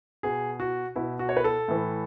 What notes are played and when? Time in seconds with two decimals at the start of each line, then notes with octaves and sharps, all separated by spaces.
0.23 B2 G#4
0.60 F#4
0.96 B2 E4
1.19 F#4
1.29 C#5
1.37 B4
1.44 A4
1.68 A2 E3